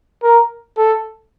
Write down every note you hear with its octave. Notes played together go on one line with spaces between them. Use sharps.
A#4
A4